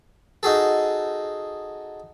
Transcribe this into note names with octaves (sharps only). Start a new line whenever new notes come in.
D#4 F#4 G#4 A4